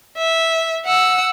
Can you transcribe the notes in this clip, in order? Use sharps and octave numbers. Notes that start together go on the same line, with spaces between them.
E5
F#5 E6